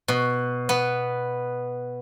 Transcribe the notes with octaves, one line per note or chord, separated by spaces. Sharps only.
B2
B3